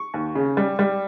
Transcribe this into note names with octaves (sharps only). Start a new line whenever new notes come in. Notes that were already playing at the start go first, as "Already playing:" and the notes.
Already playing: C#6
D#2
C#3
G3
G3